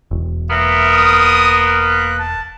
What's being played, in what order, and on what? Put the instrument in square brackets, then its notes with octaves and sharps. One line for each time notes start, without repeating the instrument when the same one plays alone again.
[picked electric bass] E1
[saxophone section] A#3 B3 A#4 [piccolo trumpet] E5
[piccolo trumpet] D#6
F#6
A5